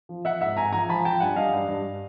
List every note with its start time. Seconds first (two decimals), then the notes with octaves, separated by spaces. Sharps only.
0.09 F3
0.25 F3 E5 F#5
0.41 G#2 E5 F#5
0.57 G#2 G#5 A#5
0.73 F3 G#5 A#5
0.89 F3 A5 B5
1.05 F3 G5 A5
1.20 G2 F#5 G#5
1.36 G2 D#5 F5
1.53 G2
1.68 G2